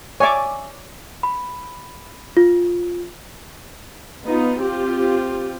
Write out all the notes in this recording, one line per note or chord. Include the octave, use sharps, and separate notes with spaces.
C#5 D5 E5 G#5 D6
B5
F4
B3 D#4 F4
C4 F4 G4